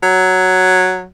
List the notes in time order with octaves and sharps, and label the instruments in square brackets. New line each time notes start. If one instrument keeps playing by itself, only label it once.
[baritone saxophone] F#3